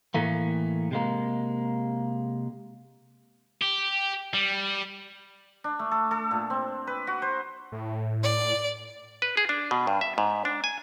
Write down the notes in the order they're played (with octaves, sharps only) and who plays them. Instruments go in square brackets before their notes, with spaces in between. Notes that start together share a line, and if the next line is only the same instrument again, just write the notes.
[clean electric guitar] A2 E3 A3 A#3
C3 G#3 A#3
[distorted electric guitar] G4
G3
[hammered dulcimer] D4
A3
A4
A4
A#2
C4
B4
F#4
C5
[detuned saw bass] A2
[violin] D5
[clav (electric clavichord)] B4
G#4
D4
B2
G2
E5
G#2
D4
G#5